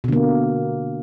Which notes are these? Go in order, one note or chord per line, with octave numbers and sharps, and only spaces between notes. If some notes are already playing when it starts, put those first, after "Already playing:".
B2 D3 A#3